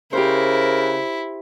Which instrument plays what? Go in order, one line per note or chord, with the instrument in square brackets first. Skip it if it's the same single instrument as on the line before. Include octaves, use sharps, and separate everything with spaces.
[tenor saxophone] C#3 [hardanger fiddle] E4 [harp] G4 C5 [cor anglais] A#4